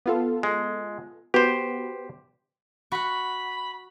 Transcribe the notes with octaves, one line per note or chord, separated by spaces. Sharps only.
B3 F4 A4
G#3
B3 F#4 G4 B4 C5
F#4 F#5 B5